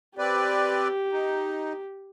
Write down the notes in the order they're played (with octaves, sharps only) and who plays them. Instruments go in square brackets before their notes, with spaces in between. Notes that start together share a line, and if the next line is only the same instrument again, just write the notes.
[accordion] C4 B4 D5 [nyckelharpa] G4
[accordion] D#4